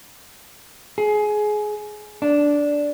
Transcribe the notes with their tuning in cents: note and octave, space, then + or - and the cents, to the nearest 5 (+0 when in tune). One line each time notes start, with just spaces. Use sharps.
G#4 +20
D4 -10